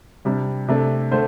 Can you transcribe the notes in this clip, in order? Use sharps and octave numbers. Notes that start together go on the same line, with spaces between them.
C3 G3 D4
C3 A3 D4
D3 A3 D4 C5